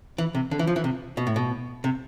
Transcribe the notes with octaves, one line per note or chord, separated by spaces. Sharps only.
E3
C3
D3
E3
F3
E3
C3
B2
A2
B2
C3